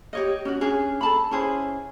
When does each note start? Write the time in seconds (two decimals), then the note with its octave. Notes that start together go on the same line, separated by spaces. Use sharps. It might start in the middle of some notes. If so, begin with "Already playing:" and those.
0.13 G4 C#5 D#5
0.45 C#4 F#4
0.61 C#4 D4 G#4
1.01 A4 A5 B5
1.31 C#4 E4 G#4 C5